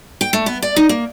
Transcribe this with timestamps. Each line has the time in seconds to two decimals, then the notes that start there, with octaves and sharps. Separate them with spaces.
0.21 G5
0.33 A3
0.46 B3
0.62 D5
0.76 D#4
0.89 A#3